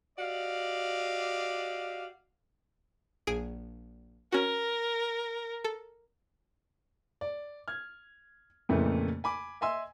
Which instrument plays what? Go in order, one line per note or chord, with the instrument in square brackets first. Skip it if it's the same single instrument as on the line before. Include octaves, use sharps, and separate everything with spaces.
[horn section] F#4 G4 D5 D#5 F5
[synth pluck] A#1 G#4 D7
[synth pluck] C#4 F#4 [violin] A#4
[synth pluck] A4
[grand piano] D5
F6 G#6
F2 A#2 C#3 E3 A3
G#5 B5 D6
D#5 E5 G#5 C6 E6